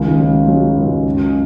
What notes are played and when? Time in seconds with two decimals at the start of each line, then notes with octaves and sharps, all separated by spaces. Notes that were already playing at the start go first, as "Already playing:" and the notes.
Already playing: C#2 D#3
0.19 F#3
0.48 F#3
0.77 C#2
1.06 F#2